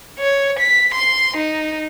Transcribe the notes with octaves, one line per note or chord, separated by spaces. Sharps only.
C#5
B6
C6
D#4